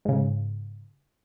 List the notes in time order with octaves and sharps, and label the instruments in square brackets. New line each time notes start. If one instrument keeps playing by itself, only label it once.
[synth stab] G#2 C#3